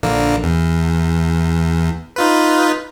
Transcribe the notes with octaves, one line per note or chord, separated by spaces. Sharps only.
A#1 D3 A#3
E2
D#4 F4 B4